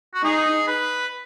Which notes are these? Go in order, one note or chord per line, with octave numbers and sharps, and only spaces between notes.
F#4
D#4 G#4
B4